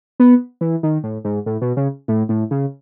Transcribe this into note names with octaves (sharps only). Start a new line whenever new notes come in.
B3
E3
D#3
A2
G#2
A2
B2
C#3
A2
A2
C#3